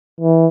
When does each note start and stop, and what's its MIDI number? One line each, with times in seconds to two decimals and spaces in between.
0.21 0.47 52